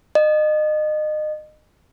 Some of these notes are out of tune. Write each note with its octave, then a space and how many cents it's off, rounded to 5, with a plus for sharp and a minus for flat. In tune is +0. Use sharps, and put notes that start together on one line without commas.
D#5 -30